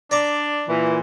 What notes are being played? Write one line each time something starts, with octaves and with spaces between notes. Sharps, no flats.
D4 D5 A#5 D6
A#2 E3